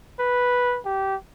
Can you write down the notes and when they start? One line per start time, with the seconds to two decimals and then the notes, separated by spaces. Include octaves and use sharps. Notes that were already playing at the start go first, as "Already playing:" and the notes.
0.19 B4
0.86 G4